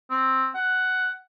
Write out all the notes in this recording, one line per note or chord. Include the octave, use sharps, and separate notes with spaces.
C4
F#5